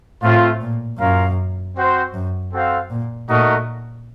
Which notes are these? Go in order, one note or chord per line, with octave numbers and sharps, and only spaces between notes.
A2 A3 C4 F4
A#2
F#2 C#4 F4 A#4 F5
C4 F#4 C5
F#2
C4 F#4 A4 C5 F5
A#2
A#2 A3 D#4 F#4 A#4 D#5